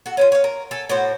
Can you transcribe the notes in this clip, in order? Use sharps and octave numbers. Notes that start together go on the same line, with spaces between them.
F#4 A4
C#4 E4 F4
C#5 F5
A#4
A4 G#5
A2 F#4 C5